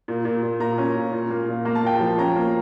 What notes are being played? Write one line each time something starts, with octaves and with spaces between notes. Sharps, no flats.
A#2
A#2
A#2
A#2 A#5
C#4
A#2
A#2
A#3
A#2
A#3 A#5
A5
A#2 G5
F3 A5
C#4 A#5
A#3